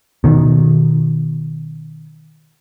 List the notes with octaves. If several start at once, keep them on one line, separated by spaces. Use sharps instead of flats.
B2 D#3